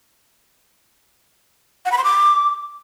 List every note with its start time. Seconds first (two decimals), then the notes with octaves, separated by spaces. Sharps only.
1.85 F#5
1.92 B5
1.98 C6
2.04 D6